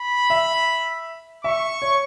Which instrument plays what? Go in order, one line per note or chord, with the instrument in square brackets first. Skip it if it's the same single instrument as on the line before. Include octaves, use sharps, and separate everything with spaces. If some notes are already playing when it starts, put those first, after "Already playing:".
Already playing: [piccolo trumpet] B5
[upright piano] E5
[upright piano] E5 [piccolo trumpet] C#6
[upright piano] C#5